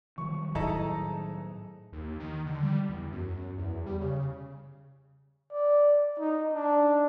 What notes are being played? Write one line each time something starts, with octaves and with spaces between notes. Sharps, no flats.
D#3 F#3 G3 C#6
A2 D#4 E4 G#4 A4 A#5
D#2
D#3
D3
G3
E2
F#2
E2
G3
C#3
D5
D#4
D4